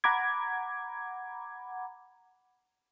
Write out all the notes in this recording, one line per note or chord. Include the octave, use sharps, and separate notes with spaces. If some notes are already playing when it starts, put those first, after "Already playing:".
F#5 A#5 B5 D6 G#6